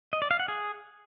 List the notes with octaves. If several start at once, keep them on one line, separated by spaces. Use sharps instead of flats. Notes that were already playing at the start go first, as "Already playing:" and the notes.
D#5
D5
F5
F#5
G#4